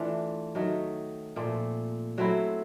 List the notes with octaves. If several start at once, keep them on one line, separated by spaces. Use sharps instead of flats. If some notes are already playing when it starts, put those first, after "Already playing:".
Already playing: E3 A3 D4 F4
D#3 F#3 A3
A#2 F3 A3 C4
F#3 A3 C4 E4